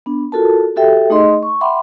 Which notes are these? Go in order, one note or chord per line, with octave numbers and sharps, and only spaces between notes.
B3 D4
F4 F#4 A4 A#4 A5
F#4 G4 A4 E5 G5
A3 D#4 G#4 D#5 C6
C#6
E5 F#5 G5 B5 C6 D6